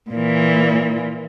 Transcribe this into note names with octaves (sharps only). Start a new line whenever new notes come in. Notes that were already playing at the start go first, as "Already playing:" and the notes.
A#2 E3